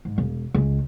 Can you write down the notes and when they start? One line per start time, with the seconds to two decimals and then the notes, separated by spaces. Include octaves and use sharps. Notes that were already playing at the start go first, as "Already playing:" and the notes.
0.05 G#2
0.18 E1
0.54 C#2